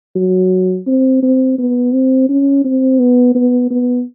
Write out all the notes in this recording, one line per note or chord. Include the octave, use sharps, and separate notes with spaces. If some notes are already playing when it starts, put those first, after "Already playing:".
F#3
C4
C4
B3
C4
C#4
C4
B3
B3
B3